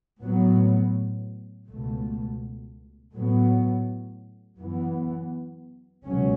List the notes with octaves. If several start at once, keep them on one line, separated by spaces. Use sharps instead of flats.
A2 F#3 B3
C#2 B2 A3
A2 F#3 B3
F#2 E3 B3
C#2 B2 F#3 C#4